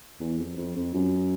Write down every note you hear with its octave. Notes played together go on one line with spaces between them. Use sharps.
E2
F2
F2
F2
F#2